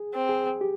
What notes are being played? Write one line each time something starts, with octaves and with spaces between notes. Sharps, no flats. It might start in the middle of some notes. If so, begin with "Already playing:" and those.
Already playing: G#4
C4
G#4
G4